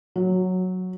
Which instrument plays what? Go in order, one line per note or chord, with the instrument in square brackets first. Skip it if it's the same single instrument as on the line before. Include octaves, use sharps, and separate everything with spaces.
[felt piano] F#3